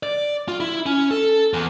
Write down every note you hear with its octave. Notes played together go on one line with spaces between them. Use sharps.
D5
F4
E4
C#4
A4
E2